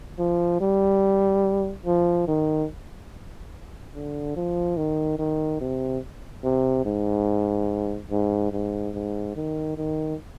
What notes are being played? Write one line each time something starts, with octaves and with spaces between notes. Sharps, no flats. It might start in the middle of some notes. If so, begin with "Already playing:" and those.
F3
G3
F3
D#3
D3
F3
D#3
D#3
C3
C3
G#2
G#2
G#2
G#2
D#3
D#3